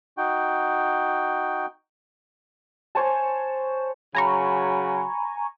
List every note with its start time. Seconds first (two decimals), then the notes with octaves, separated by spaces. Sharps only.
0.17 D#4 F#4 G5
2.95 C5 C#5 G#5 A5
4.15 C#3 F#3 G#5 A#5 B5 C#6